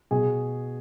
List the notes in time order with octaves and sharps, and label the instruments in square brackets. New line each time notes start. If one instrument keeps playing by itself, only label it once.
[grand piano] B2 G#4